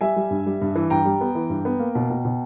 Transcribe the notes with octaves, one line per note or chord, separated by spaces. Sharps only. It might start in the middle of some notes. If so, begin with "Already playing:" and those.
G3 E5 G#5
G3
G2
G3
G2
E3
G2 G5 A#5
G3
B3
E3
G2
B3
A#3
B2
B2
B2